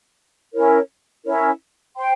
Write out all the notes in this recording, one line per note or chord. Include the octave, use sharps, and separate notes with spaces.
C#4 E4 A#4 C#5
C#4 E4 A#4 C#5
C5 G5 C6